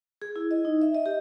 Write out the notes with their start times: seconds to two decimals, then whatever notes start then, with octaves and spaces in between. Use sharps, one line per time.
0.22 G#4
0.36 E4
0.51 D#5
0.65 D#4
0.82 E5
0.95 D#5
1.06 G4